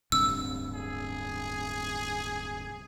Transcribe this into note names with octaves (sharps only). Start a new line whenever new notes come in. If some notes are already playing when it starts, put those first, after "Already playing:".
D1 G2 C3 E6
G#4